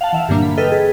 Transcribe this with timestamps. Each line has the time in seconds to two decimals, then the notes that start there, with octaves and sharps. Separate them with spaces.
0.01 F5 F#5 A5
0.13 E3 E5 F5
0.28 G2 A#2 D3 F#3 A#3 D4
0.42 B5
0.58 A4 B4 D#5 E5 G5 F6
0.72 G#4 A4 B4